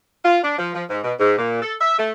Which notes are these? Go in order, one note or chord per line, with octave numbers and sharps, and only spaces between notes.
F4
D4
F3
F3
G#2
B2
G#2
A#2
A4
E5
A3